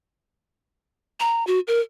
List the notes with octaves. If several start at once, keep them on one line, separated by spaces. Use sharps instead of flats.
A#5
F#4
A#4